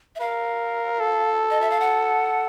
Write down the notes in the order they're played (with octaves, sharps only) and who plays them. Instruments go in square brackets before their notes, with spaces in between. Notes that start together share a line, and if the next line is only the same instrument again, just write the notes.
[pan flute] E5
[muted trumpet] A#4 [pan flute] F5
[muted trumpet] A4
[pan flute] D#5
E5
F5
F#5